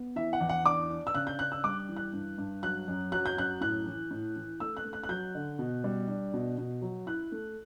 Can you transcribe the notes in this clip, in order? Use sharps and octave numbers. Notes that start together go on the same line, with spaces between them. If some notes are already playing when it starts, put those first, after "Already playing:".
Already playing: B3
E3 E5
F#5
E2
F#5
D4 D6
D4
E6
C#3 F#6
G6
D4 F#6
E6
G3 D6
E3
F#6
G2
G2
F#3 F#6
F#2
F#3 F#6
G6
F#2 F#6
A2 F#6
E3
A2
E3
A3 E6
F#6
A3
F#6
F#6
F#3 G6
D3
B2
G3
D4
B2
B2
F#3
E4 F#6
A3